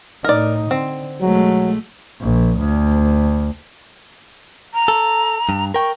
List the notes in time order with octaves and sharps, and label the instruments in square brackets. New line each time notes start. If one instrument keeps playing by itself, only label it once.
[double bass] A2 D#4 [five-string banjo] A#4 D5
[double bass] D3 [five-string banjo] C4
[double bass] B1 [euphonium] F#3 [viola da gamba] G#3 A3
[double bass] A#1
D2
[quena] A#5
[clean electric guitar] A4
G2
[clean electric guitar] A#4 G5 [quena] C#6